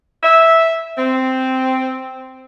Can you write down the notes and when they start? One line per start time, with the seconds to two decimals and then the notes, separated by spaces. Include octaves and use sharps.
0.23 E5
0.98 C4